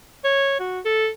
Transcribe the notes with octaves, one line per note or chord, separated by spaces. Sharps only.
C#5
F#4
A4